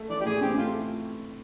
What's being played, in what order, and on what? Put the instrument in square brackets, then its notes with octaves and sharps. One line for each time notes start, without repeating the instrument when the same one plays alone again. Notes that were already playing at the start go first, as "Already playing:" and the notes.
Already playing: [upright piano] A3
[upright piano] E3 [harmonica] D5
[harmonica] G4
[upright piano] A2 [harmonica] G#4
[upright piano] C4 [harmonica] G4
[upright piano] A3 [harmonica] F4